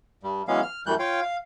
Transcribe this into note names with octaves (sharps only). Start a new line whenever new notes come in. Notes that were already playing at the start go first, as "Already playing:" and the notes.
G2 G3
E3 F#3 G#3 B3 C#4 F5
F6
F#2 E3 G3 A3 F#6 G6
F4 C#5 F5 G5
F5